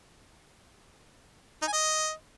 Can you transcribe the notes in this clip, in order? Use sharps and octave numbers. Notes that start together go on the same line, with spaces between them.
D#4
G#5
D#5